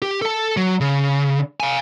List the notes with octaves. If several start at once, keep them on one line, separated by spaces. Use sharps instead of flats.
G4
A4 A5
F#3
C#3
F5 G#5